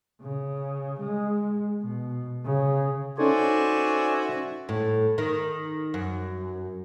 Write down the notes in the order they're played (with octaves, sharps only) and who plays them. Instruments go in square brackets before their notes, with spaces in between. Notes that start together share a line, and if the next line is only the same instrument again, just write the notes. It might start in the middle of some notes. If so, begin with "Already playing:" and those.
[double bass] C#3
G#3
B2
C#3
[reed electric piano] C#4 D#4 A4 [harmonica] F#4 E5 [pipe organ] C5 D5 G#5
[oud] A2
D#3
F#2